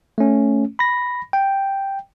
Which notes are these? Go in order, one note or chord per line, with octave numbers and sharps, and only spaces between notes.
A3 C#4
B5 A#6
G5